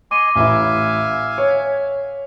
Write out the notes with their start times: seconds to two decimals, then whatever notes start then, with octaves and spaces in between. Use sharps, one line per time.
0.11 D#5 G#5 C6 D6 D#7
0.36 A1 E4 E5 F5 G#5
1.38 C#5